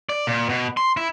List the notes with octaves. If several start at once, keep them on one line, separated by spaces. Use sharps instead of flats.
D5
A#2
B2
C6
E4